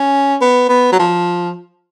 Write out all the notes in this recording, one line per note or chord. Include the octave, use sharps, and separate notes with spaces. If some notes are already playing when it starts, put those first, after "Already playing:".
Already playing: C#4
B3
B3
F#3
F3